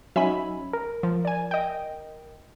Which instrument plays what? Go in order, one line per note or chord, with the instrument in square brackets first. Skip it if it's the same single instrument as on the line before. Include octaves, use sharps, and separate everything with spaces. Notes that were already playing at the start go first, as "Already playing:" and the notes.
[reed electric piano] F#3 C#4 D#4 [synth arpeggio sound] E5 G#5 B5
[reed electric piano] A#4
[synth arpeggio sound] F3
D5 G#5
D#5 G5